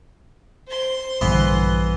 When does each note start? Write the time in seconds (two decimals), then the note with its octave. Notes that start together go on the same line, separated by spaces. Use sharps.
0.68 C5 C6
1.21 A#1 G2 D3 E3 B3